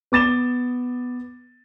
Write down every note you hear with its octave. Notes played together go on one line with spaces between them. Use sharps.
B3 D6 A6 E7 G7